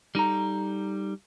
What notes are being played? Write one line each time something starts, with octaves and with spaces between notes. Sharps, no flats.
G3 D#4 A4 A#5